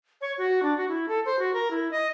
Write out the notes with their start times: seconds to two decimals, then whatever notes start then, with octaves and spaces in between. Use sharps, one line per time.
0.21 C#5
0.38 F#4
0.63 D4
0.77 F#4
0.89 E4
1.08 A4
1.26 C5
1.39 F#4
1.53 A#4
1.71 E4
1.92 D#5